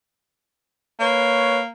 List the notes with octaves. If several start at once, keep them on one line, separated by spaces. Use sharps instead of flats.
A#3 B4 C#5